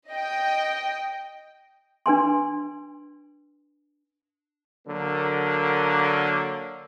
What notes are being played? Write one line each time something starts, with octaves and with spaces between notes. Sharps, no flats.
D#5 G5
D4 B4 G#5 C6
D3 F#3 A#3